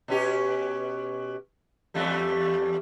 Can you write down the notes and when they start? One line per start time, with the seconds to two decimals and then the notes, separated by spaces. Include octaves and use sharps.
0.08 B2 C#4 G4
1.94 E2 G3 A3